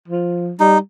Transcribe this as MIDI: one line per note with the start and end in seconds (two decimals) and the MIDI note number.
0.08 0.52 53
0.60 0.78 55
0.60 0.78 63